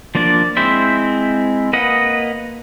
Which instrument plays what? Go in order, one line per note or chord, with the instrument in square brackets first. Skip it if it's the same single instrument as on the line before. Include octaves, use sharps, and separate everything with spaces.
[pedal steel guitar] F3 A#3 D4 D5
G#3 C4 E4 C5 E5
A#3 B4 D#5 F#5